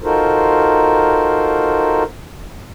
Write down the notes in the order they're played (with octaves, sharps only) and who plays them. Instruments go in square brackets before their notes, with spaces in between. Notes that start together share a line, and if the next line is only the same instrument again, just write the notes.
[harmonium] D#4 F4 F#4 A4 A#4 C5